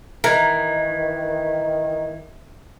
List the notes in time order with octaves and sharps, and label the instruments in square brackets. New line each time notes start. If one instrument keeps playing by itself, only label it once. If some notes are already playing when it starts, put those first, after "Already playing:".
[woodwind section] D#3 [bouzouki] E3 [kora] A#4